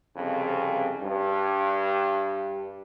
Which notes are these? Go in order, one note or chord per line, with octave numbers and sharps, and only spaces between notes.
C2 F2 C#3
G2